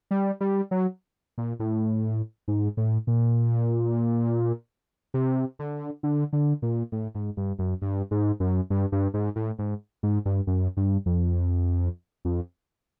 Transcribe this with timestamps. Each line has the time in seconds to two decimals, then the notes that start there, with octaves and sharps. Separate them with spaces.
0.11 G3
0.41 G3
0.71 F#3
1.38 A#2
1.60 A2
2.48 G#2
2.77 A2
3.07 A#2
5.14 C3
5.59 D3
6.03 D3
6.33 D3
6.62 A#2
6.92 A2
7.15 G#2
7.37 G2
7.59 F#2
7.81 G2
8.11 G#2
8.40 F#2
8.70 G2
8.92 G2
9.14 G#2
9.36 A2
9.59 G#2
10.03 G#2
10.25 G2
10.47 F#2
10.77 G2
11.06 F2
12.25 F2